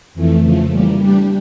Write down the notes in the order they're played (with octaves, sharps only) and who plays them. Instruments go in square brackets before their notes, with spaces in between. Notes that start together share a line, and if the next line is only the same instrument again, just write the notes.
[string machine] F2 E3 A3
C#3 F3 A3
E3 G3 A#3
G3 D4 G4